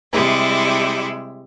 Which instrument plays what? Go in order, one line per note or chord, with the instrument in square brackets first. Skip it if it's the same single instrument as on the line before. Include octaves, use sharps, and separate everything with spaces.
[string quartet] C3 G3 G#3 E4